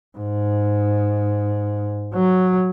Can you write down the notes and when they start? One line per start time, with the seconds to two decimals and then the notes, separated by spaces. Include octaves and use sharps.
0.18 G#2
2.14 F#3